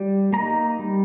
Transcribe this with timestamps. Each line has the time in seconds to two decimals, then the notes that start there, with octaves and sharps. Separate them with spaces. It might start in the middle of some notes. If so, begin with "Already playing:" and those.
Already playing: G3
0.33 A#3 D#4 A#5
0.79 G3